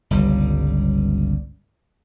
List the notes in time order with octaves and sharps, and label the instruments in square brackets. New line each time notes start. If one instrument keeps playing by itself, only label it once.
[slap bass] G1 C#2 G3